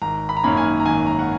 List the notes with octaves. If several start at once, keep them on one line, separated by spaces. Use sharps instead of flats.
G#1 A#5
B5
A#5
F#2 D#3 A#3 C#4 B5
G#5
A#5
G#1 G#5
A#5
F#5